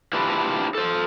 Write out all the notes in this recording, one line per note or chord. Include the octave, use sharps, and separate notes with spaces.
D4 E4 F4 G4 B4
A4 C5